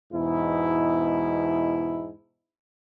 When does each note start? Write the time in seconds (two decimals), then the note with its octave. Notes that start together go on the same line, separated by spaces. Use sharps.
0.13 E2 G#2 B2 E4